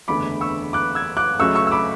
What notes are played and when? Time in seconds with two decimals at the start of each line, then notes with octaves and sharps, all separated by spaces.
0.08 F#1 E2 D3 A3 B5 D6
0.41 C#6 E6
0.73 D6 F#6
0.95 E6 G#6
1.17 D6 F#6
1.39 C#2 C#3 F#3 A3 C#6 E6
1.55 C#6 E6
1.67 E6
1.71 B5 D6